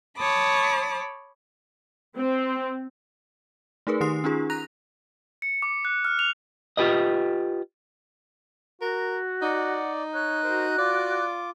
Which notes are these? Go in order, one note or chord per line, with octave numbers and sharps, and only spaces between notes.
C#5 A5 B5 D6 D#6
C4
A3 D#4 G#4 A#4 B4
D#3 D#4 G4 C6 D#6 C7
C#4 D#4 F4 G#4
A#5 F#6 A#6 F7
C#7
D6
F#6
F6
F7
F4 G4 B4 D#5
F#4 A#4
D#4 D5 F#5
C#5 F#6
F#4 A#4 C5
F4 D5 D6